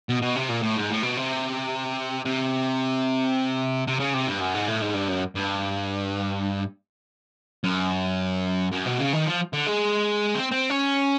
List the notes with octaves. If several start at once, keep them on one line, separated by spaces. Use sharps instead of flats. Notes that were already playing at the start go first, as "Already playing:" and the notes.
B2
B2
C3
A#2
A2
G#2
A2
B2
C3
C3
C3
C#3
C3
G2
F#2
G#2
A2
G#2
G2
F#2
G2
F#2
F#2
B2
C#3
D#3
F3
D3
G#3
C4
C4
C#4